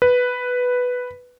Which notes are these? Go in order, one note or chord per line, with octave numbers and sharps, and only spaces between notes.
B4